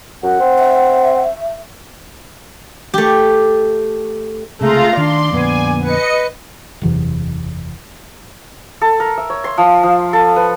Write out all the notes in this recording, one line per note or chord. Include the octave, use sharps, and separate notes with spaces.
F#2 F#5
C4
E5
A3 G4
C#2 C3 A3 F4 G#4 F5 A#5
D#3 D4 D5 C6
F2 A#2 D3 B3 G#5
B4 D#5 C#7
F#1 E2 C3
A4
A#4
E5
C#5
C6
F3
F3
A4
B4